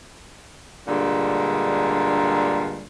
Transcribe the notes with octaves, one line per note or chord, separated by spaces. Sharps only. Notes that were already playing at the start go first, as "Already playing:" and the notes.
G2 A#2 D3 G#3